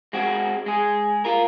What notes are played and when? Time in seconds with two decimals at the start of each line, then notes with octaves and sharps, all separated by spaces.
0.13 G#3 C4 F#4
0.66 G#3 G#4
1.25 F4 A#4